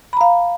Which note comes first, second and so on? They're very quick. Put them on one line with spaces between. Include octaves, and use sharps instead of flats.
B5 A#5 F5